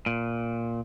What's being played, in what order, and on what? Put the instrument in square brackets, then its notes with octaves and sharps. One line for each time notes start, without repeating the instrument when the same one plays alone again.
[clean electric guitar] A#2